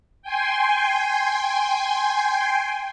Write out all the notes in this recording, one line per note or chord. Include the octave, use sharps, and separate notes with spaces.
G5 G#5 C6